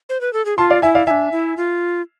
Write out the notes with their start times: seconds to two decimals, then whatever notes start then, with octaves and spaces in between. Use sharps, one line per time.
0.09 C5
0.21 B4
0.33 A4
0.45 G#4
0.58 F4 A5 C6
0.70 D5 F5
0.82 E4 E5 G#5
0.95 D5 F5
1.07 D4 E4 E5 G#5
1.32 E4
1.57 F4